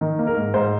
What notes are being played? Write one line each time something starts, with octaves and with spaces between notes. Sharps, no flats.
D#3
A#3
A#4
G#2
G#2 C5